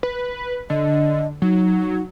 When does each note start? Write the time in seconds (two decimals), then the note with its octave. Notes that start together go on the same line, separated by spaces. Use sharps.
0.03 B4
0.70 D3 D#5
1.42 F#3 D#4